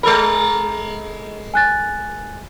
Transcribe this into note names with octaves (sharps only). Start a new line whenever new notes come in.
G#3 A4 A#4 B5
G#5 F#6 A6